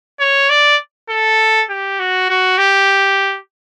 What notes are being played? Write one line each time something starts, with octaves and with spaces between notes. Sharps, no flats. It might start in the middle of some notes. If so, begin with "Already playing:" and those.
C#5
D5
A4
G4
F#4
F#4
G4